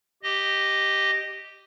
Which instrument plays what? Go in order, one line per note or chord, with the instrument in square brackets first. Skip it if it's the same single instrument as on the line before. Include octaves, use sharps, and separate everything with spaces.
[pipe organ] G4 D#5